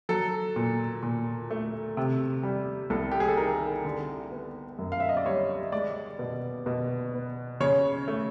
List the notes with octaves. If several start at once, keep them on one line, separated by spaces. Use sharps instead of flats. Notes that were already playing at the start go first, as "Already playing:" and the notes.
F#3 A4
A#2
A#2
A3
C3
G3
C2 A4
G4
G#4
A4
D#3 A#4
D3
B3
F#2
F5
E5
D#5
D5
G3 C#5
G#3 D5
B2
B2
B3
C#3 C#5
A3